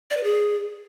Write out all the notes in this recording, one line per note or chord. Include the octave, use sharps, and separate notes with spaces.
D5
B4
G#4